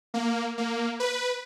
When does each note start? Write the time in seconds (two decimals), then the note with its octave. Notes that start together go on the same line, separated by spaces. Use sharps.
0.14 A#3
0.58 A#3
1.00 B4